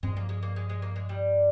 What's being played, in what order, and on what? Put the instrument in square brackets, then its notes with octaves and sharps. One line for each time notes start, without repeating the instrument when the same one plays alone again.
[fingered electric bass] G2 F3 C4 [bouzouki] G#3
[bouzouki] A#3
G#3
A#3
G#3
G#3
A#3
G#3
G3